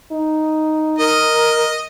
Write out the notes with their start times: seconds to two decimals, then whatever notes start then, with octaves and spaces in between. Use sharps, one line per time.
0.12 D#4
0.99 A#4 D#5